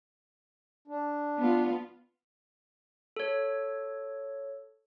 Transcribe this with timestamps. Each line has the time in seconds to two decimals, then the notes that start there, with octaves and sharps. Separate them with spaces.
0.88 D4
1.38 B3 F4
3.16 A4 C#5